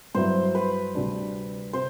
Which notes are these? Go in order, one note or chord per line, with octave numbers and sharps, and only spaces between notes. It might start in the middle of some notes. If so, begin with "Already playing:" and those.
G2 F#3 C4 E4 C5
B4
D2 C3 G3 D4
C3 C5